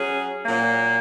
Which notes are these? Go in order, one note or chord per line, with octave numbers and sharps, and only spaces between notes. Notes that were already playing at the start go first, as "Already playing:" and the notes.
Already playing: F#3 C#4 G#4
A#2 F#3 A#3